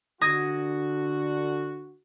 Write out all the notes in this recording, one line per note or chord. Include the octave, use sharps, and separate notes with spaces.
D3 F#4 D#6 G#6 A#6